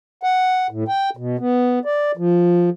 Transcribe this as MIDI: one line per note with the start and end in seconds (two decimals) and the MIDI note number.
0.23 0.67 78
0.70 0.84 45
0.88 1.10 79
1.17 1.37 47
1.39 1.79 59
1.85 2.12 74
2.17 2.70 53